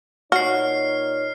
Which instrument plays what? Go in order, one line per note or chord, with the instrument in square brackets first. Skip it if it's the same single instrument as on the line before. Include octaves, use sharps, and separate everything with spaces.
[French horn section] A#2 D#4 C#5 [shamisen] F#4 [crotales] F6 C7